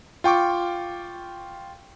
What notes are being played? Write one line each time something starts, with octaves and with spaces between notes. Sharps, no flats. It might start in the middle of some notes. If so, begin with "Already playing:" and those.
F4 G5 C#6 D6